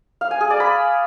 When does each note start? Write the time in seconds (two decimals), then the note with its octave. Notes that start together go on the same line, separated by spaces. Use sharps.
0.21 F5
0.31 G#5
0.41 G#4
0.50 D5
0.60 B5